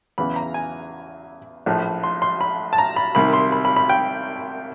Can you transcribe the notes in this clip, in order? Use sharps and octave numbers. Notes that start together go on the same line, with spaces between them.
E2 C#3 E3 B5
A#5
G#5
A#1 A2 F3
C6
C6
B5
A5
A#5
B5
C2 C3 D#3 B5
C6
B5
B5
B5
G5